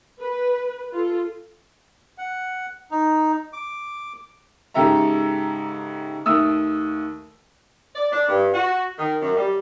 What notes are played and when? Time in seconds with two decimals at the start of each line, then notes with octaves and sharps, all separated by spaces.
0.20 B4
0.93 F4 A4
2.18 F#5
2.91 D#4
3.53 D6
4.74 G#2 C#3 G4 A4 E5 A#5
6.26 D#2 A3 D#6 E6
7.95 D5
8.13 D4
8.29 G2
8.54 F#4
8.98 D#3
9.22 F#2
9.36 G3